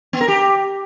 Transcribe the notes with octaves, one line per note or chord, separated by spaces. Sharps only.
B3
A#4
G4